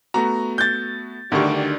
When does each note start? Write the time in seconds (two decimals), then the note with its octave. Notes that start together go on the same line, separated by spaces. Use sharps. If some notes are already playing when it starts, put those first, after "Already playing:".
0.14 A3 B3 F#4 A#5
0.58 G6 A6
1.32 D2 D#3 G3 D4 C#6